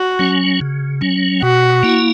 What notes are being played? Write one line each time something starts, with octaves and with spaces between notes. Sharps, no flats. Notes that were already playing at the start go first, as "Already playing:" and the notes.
Already playing: F#4
F#3 C#4
C#3
F#3 C#4
B2 F#4
A#3 E4